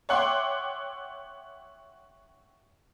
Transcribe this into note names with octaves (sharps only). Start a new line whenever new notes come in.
C#5 E5 F#5 G5 C6 D6